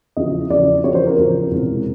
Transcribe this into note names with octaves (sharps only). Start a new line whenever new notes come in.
E2 C#3 F3 D#5
E2 C#3 F3 D5
E2 C#3 F3 C#5
C5
A#4
E2 C#3 F3
E1 E2 C3